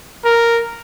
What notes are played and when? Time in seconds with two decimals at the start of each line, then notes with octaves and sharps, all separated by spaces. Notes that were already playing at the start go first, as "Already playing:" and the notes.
0.25 A#4